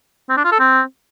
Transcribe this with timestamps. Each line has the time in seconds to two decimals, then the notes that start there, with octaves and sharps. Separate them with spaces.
0.29 C4
0.37 D4
0.44 F4
0.52 A4
0.59 C4